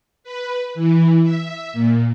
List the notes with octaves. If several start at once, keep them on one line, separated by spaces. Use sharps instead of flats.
B4
E3
E5
A#2